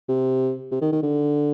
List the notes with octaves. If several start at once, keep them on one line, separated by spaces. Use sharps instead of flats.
C3
C3
D#3
D#3
D3